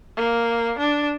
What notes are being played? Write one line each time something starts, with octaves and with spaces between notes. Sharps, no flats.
A#3
D4